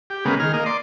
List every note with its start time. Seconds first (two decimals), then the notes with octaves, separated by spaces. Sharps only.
0.10 G4
0.25 C#3 G#3 A#3 B3
0.40 D#3 G#4 F6
0.54 A#3 D#5
0.66 D5 C6